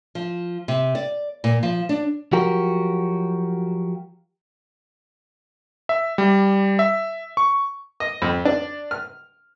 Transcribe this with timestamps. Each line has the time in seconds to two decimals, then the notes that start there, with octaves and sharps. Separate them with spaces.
0.15 F3
0.68 C3
0.95 D5
1.44 A#2
1.63 F3
1.89 D4
2.33 F3 F#3 F#4 G4 A#4
5.89 E5
6.18 G3
6.79 E5
7.37 C#6
8.00 D#5
8.22 F2
8.45 D4
8.91 F6